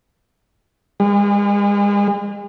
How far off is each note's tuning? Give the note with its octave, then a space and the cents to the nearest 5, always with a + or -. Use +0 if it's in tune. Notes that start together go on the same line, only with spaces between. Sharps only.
G#3 -40